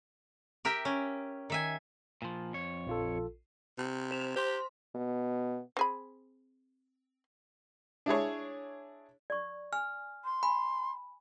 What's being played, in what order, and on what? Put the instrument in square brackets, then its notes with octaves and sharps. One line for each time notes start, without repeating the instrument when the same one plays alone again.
[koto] G4 A#4 E5 G5
C#4
D#3 E5 G#5
[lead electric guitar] A#2 F3
F2 C#5
[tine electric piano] A#1 F4 A4
[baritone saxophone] C3
[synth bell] C5 E7 F7
[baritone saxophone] G4 [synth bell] C5 C6
[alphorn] B2
[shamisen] C4 G#4 B5
[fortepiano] D4 E4 G#4 C#5
[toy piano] D5 C#6
[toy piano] G#5 [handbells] F6
[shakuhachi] C6
[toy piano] G#5 [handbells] B5